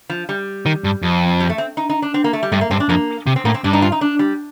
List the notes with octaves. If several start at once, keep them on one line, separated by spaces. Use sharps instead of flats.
F3
G3
D#3
G2
F2
G3
A3
C4
D#4
D#4
D4
C4
A#3
A3
G3
G2 A3
A#3
G2 C4
D4
F2 A#3
C3
C4
A2 A#3
C4
G2 D4
D#4
F4
D#4
D4
G3